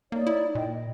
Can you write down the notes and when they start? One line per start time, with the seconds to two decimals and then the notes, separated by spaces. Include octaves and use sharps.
0.12 A#3 D#4 C#5 D5
0.27 E4
0.55 A#2 D#5 G5
0.68 D#5